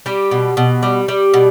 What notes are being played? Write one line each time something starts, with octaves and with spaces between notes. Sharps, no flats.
G3 G4
B2
B2
G3
G3
B2